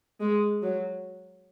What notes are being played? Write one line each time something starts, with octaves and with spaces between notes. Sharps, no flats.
G#3
F#3